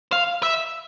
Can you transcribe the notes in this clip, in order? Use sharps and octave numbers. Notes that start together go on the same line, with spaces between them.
F5
E5